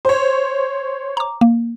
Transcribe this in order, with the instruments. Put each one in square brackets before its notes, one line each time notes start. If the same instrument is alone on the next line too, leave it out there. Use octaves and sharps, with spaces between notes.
[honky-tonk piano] C5 C#5
[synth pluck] A#5 D6
A#3